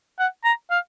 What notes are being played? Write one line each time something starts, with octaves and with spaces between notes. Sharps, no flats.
F#5
A#5
F5